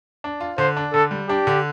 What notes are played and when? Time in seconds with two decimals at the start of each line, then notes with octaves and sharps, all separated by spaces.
0.24 D4
0.40 F4
0.58 D3 C5
0.77 D4
0.94 D3 A4
1.11 G3
1.28 D4 G4
1.47 D3